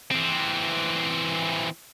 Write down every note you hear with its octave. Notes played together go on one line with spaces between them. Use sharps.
E3 C4